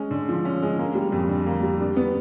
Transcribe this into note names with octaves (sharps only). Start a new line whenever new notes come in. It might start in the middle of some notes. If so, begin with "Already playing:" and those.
Already playing: G#3 C#4
D3
F3
C#4
G#3
A#3
G3
F2
D3
A#3
G3
D4
B3